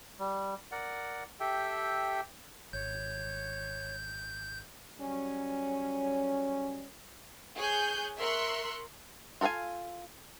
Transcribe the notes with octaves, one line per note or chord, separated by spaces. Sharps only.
G3
A#4 D5 F#5
G4 A4 E5 G5
G#1 C#5 G6
F#3 G3 C#4
G#4 C#5 G#5 F#6 G6
A#4 E5 C6 C#6 E6 F#6
F4 A4 A#4 F5 G#5